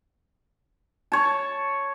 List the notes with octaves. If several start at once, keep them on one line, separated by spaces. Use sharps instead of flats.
C#5 A5